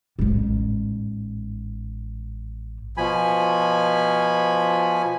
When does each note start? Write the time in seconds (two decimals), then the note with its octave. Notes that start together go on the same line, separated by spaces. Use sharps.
0.19 A1 G#2
2.97 B2 F3 G#5 B5